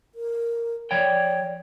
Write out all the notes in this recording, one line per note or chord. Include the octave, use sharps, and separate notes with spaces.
A#4
F3 C#5 D5 G5